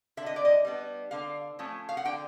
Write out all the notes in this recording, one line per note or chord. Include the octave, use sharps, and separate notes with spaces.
D3 E5
D#5
D5
D#5
G3 B3 D4
D3 F5
F3 A3 C#4
F5
F#5
D3 G5